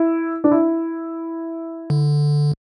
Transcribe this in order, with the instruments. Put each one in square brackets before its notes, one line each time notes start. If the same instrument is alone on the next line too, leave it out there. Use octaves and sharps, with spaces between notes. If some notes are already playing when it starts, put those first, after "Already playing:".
Already playing: [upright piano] E4
D4
E4
[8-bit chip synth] D3